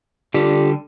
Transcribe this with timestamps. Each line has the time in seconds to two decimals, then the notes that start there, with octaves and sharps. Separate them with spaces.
0.34 D3 G3 F4 G4 A4